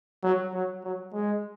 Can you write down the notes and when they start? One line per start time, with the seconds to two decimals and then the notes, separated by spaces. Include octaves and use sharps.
0.23 F#3
0.54 F#3
0.84 F#3
1.13 G#3